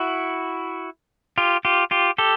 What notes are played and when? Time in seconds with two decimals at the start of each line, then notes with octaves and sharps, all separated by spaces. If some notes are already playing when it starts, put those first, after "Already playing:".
Already playing: E4 F#4
1.38 F4 G4
1.65 F4 G4
1.91 F4 G4
2.18 G4 A4